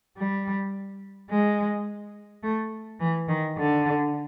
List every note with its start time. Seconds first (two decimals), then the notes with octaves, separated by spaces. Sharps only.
0.17 G3
1.30 G#3
2.43 A3
3.00 E3
3.28 D#3
3.56 D3